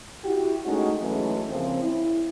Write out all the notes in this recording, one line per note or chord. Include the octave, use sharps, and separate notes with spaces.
E4 F#4 G4
G#3 A3 C#4 D#4 F#4
E3 F#3 G#3 A3 C#4
A#2 C#3 F3 C4
E4